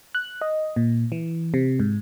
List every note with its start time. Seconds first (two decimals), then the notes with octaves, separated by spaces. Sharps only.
0.15 F#6
0.41 D#5
0.76 A#2
1.12 E3
1.54 C3
1.79 G#2